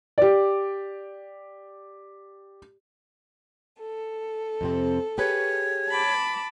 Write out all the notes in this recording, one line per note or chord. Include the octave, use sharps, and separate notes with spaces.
G4 D5
A4
F2 C3 C4
G4 G#4 B4 C#5
A5 B5 D6